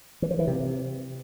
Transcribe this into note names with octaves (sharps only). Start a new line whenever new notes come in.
E3
F3
E3
C3